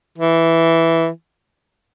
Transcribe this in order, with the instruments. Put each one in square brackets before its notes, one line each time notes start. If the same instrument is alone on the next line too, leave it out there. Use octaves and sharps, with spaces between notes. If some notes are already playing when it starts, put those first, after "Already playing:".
[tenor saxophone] E3